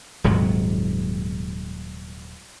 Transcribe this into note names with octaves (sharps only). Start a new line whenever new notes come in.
D#1 G#2 C3 F#3